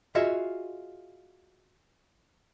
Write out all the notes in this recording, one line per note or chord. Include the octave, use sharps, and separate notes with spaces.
F4 F#4 G#4 D#5 E5